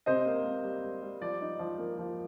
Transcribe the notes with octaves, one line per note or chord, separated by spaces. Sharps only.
C3 C5 D#5
A#3
A#3
G3
G3
G3
F3 D5
D#4
F3
A#3
F3